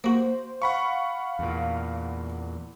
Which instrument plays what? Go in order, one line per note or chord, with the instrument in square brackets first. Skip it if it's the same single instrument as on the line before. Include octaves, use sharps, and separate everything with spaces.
[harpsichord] A#3 F#4 [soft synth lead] C5
[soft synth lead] F5 [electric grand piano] F#5 B5 C#6
[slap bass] E2 A#2